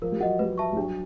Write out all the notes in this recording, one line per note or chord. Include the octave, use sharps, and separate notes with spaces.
F3 A#4
G3
F#3 D#5 F#5
G3 B4
E5 A5 C#6
G3
F#3 D4